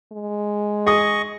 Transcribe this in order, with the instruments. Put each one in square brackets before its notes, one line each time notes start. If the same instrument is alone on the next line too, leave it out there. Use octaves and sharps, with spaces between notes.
[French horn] G#3
[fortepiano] G#4 D#6 [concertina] D#5 C#6